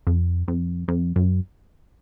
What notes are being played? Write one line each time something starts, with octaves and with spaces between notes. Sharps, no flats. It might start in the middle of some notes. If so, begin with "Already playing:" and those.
F2
F2
F2
F#2